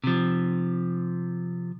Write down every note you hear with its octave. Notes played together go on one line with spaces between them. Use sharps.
C3 F3